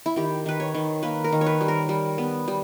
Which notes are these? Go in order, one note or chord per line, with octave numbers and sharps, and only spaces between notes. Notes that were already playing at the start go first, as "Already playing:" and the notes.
E4
D#3 G4
D#3 B4
C#5
D#3
A#3 B4
A#4
D#3
C#5
B4
G3
A#4
G3
B3
G3